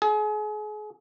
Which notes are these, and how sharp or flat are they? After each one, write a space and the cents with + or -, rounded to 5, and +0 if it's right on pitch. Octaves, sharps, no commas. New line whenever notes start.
G#4 +35